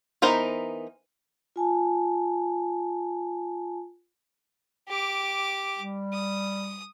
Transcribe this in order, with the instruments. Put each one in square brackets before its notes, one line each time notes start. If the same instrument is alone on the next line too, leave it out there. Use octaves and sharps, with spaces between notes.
[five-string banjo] E3 B3 D#4 A#4 C5
[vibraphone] F4 G#5 A5
[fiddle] G4 D6
[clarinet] G3
[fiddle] D#6